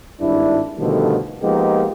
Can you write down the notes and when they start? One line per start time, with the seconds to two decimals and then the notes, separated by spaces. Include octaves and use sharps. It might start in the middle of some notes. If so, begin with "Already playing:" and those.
0.21 G#1 G2 D4 E4
0.79 B2 D3 D#3 F3 G3 A3
1.42 F3 G#3 A#3 B3 D#4 G4